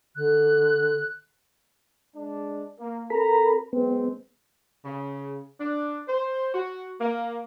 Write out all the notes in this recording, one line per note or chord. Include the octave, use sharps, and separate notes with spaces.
D3 F#6
G#3 D4
A#3
C4 A4 A#4 A#5 B5
F#3 G#3 B3 C4
C#3
D4
C5
F#4
A#3